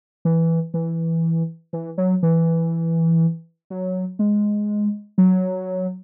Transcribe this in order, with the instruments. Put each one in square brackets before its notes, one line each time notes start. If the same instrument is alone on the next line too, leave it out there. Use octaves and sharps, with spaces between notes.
[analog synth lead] E3
E3
E3
F#3
E3
F#3
G#3
F#3